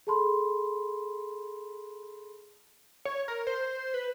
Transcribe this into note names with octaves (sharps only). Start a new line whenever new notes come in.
G#4 A4 A5 B5 C6
C#5
A#4
C5
B4